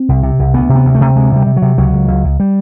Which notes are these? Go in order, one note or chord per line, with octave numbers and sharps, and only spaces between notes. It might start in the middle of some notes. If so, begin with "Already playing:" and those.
Already playing: C4
C2
C3
C2
D2 B3
C3
B3
D2
A3
C3
D2 G#3
C3 G3
C3
F#3
C3
C#2 F#3
C#2
C#2
C#2
G3